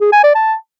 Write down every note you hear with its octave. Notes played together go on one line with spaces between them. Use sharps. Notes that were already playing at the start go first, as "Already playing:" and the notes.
G#4
G#5
D5
A5